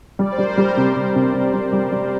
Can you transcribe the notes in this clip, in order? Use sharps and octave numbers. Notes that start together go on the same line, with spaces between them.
G3 D5
C5
G3
A#4
G3 G4 C5
C3
C3
C3
C3
G3
G3
G3